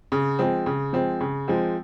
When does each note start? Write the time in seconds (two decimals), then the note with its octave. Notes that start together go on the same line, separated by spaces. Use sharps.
0.12 C#3
0.39 F3 G#3 C4
0.66 C#3
0.93 F3 G#3 C4
1.21 C#3
1.48 F3 G#3 C4